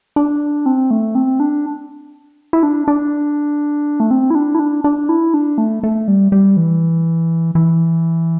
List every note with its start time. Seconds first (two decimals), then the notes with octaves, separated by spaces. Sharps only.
0.16 D4
0.66 C4
0.91 A3
1.15 C4
1.40 D4
2.53 E4
2.63 D4
2.88 D4
4.00 A3
4.11 C4
4.30 E4
4.35 D4
4.55 E4
4.59 D4
4.84 D4
5.09 E4
5.34 D4
5.58 A3
5.83 A3
6.08 G3
6.32 G3
6.57 E3
7.55 E3